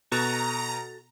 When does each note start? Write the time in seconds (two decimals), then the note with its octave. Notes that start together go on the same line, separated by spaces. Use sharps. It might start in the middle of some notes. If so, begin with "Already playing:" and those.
0.12 B2 F#4 A4 A5 A#5